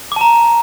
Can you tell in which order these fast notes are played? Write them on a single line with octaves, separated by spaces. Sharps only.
D6 A5 A#5